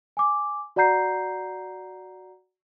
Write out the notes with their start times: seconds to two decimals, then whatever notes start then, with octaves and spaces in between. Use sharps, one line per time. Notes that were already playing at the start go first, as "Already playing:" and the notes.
0.17 G#5 D6
0.76 F#4 D5 F#5 A#5 G6 C7